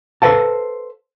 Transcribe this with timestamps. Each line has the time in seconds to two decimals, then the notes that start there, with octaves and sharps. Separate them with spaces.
0.22 A4 B4 C5 F5 A5